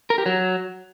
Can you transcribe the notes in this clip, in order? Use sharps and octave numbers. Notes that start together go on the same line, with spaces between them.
A#4
G4
F#3